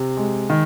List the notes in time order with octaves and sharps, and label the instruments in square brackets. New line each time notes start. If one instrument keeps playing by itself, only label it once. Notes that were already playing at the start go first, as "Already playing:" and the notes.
Already playing: [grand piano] C3
G#3
D#3